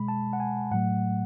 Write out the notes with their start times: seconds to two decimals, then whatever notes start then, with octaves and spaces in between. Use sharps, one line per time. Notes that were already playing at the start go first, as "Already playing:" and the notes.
Already playing: B2 G#3 B5
0.08 A5
0.33 F#5
0.40 G#5
0.71 A2 F#3 A3 F#5